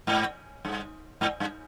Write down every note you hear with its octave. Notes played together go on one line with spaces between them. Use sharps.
G#2
G2
G#2
G2